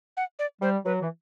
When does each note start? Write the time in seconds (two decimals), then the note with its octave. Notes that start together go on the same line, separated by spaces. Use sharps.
0.17 F#5
0.39 D5
0.62 G3 C5
0.85 F#3 B4
1.02 E3